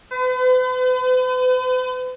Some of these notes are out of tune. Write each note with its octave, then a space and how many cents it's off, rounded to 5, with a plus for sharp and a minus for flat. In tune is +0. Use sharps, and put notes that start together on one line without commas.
B4 +45